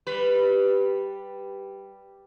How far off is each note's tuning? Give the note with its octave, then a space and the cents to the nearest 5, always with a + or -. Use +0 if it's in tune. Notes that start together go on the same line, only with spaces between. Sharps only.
G3 +0 B4 +0